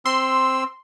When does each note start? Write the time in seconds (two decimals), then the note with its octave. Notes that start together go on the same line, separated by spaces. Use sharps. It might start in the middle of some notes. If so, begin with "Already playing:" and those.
0.06 C4 C6 E6